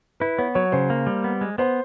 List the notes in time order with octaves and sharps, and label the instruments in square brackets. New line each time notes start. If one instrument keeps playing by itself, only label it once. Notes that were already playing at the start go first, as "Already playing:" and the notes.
[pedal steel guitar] E4 [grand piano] B4
[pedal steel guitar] B3 [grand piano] C#5
[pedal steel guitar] F#3 [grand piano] C#5
[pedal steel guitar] C#3 [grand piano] C5
[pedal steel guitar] A#3
G3
B3
G#3
[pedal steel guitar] B3 [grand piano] C5